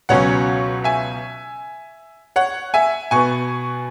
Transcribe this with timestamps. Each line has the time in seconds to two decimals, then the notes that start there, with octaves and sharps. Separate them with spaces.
0.09 C#2 B2 F#3 C#4 C#5 F#5
0.84 E5 G#5
2.36 C#5 F#5
2.74 E5 G#5
3.11 B2 B3 G#5 C#6